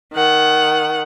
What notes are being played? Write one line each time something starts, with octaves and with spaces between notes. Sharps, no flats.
D#3 F#5